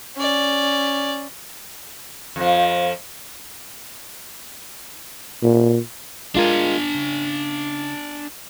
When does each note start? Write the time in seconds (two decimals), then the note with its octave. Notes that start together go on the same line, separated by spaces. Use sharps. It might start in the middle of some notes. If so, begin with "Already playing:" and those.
0.16 C#4 D5
2.36 F2 F3
5.43 A#2
6.35 G#3 D4 F4 A#4 G#5
6.95 C#3